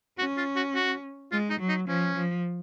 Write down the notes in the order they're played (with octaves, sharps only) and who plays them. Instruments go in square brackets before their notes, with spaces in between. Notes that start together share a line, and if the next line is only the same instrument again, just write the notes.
[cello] C#4 [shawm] F#4
[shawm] F4
F#4
F#4
[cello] G#3 [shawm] F4
[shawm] D#4
[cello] F#3
[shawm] D#4
[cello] F3 [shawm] C#4
[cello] F3